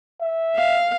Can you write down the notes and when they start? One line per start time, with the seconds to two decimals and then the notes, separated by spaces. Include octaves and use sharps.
0.22 E5
0.57 F5